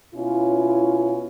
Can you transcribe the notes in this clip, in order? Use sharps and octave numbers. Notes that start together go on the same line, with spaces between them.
B2 C#4 E4 F4